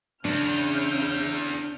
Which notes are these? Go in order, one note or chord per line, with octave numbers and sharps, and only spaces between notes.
E2 C#3 D4 F6 G6